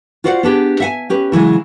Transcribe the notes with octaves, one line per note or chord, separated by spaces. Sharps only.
F4 F#4 C5 D5 D#5 F#5
B3 D4 G4 G#4
E5 F#5 G#5
C#4 G4 B4
C#3 E3 F#3 G#3